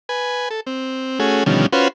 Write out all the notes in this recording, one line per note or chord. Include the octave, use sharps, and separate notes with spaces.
B4 G#5
A4
C4
A3 C#4 F#4 G#4
B2 D3 D#3 F3 G3 C#4
C#4 F4 F#4 B4 C5